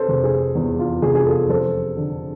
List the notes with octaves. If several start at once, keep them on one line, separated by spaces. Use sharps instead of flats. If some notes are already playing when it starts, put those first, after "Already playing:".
Already playing: C3 G#4 A4 B4 C5
F1
G#4
E2
F4
F1 G#4
G#4
F4 A4
F2 A4 C5
D3